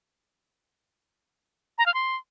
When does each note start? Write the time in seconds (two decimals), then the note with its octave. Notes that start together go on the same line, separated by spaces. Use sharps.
1.78 A#5
1.86 F5
1.94 C6